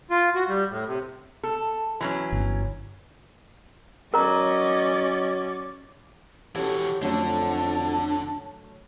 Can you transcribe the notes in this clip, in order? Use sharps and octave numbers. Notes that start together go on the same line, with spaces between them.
F4
F#4
G3
A2
C3
A4
E3 F#3 C#4
G1
F#3 C#4 A#4 D5 D#5 A#5
E3 C#4 F#4 G4 A4
F2 D3 F#3 A3 C#4 A5